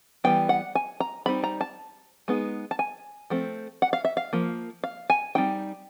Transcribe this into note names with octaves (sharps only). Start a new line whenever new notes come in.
E3 G3 B3 D4 G5
F#5
G#5
A#5
G3 C4 D#4 B5
A#5
A5
G#3 B3 D#4
A5
G#5
F3 A3 C4
F#5
F5
E5
F5
F3 A#3
F5
G#5
G3 C4 D#4 G5